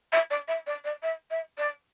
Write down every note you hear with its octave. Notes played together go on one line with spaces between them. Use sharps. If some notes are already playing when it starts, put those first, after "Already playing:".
E5
D5
E5
D5
D5
E5
E5
D5